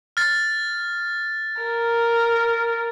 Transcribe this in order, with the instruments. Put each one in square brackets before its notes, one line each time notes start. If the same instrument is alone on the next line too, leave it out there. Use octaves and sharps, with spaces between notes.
[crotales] F6 A6
[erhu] A#4